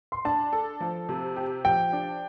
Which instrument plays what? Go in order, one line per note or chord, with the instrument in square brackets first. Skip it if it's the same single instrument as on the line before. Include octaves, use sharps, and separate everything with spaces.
[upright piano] C6
[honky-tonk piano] D4 [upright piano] A5
[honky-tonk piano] A4
F3
C3
G4
[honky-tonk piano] F3 [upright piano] G5
[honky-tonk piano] D4